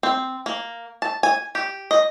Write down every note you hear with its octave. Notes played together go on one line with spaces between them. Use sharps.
C4
A#3
A5
G#5
G4
D#5